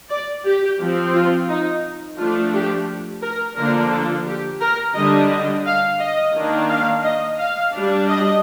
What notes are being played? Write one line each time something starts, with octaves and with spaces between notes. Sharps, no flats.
D5
G4
F3 C4
F4
D#4
F3 A3 D4 F4
G4
A#4
D3 F3 A#3 D4 A#4
A4
G4
A#4
D3 G3 D4 D#5
D#5
F5
D#5
D#3 A#3 D4
F5
D#5
F5
G3 D4
D#5